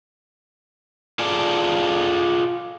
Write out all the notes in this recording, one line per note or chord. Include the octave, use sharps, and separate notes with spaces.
F4 G#4 A4 D5